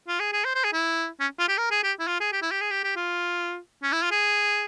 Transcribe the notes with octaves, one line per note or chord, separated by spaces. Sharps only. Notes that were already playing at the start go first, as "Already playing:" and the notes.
F4
G#4
G#4
C5
C5
G#4
E4
C#4
F4
G4
A#4
G#4
G4
E4
F4
G#4
G4
E4
G4
G#4
G4
G4
F4
C#4
E4
F4
G#4